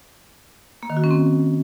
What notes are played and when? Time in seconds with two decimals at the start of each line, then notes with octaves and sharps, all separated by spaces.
0.83 A#3
0.90 D#3
0.97 F#4
1.04 C#4
1.11 C4